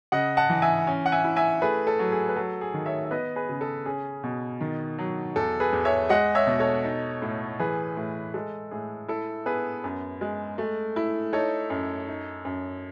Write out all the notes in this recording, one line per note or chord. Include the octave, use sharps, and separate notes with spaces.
C#3 D#5 F#5
F#5 A5
E3
E5 G#5
C#4
F#5
E5 G#5
E4
E5 G#5
A3 G#4 B4
A4
F#3
G#4
B4
F#3 A4
G#4
D#3
C#5 E5
E5
B3 B4 D#5
G#4 B4
C#3
A4
C#4 G#4
B2
D#3
F#3
E2 A4
G#4 B4
E2
C#5 E5
G#3 D#5 F#5
C#5 E5
B2
A4 C#5
D#4
A2
E3 G#4 B4
A2
G#3 A4
A2 G#4
E4 A4
B3 G#4 B4
F#2
G#3
A3
E4
D#4 A4 C#5
F#2
D#4
F#2